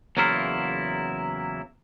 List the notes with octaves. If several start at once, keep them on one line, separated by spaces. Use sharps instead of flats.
E2 C#3 F#3 A#3 E4 F4